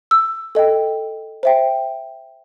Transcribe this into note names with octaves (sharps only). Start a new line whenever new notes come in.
E6
A4 D#5 G5
C5 E5 G5